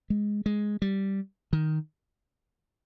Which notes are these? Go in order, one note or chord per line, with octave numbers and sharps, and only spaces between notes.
G#3
G#3
G3
D#3